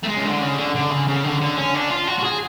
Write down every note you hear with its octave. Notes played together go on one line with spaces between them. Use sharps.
A3
G#3
C#3
D3
C#3
D3
D3
C#3
C#3
D3
D3
C#4
D4
F4
F#4
F#4
G#4